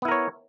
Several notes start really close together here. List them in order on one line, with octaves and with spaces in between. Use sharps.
B3 E4 A#4 C#5